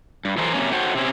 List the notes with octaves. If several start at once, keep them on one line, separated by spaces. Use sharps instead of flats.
G2
E3 F#3 A4 A#4 C5
C3 F#3 A#3 C#4
F#4 A4 C5 C#5 F#5 G5
C3 C4 C#4